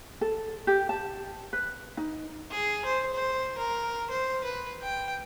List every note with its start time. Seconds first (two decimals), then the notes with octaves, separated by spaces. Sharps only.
0.21 A4
0.67 G4
0.89 A5
1.53 B4
1.97 D#4
2.51 G#4
2.85 C5
3.13 C5
3.58 A#4
4.10 C5
4.44 B4
4.82 G5